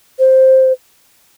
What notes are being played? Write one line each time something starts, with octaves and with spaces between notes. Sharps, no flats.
C5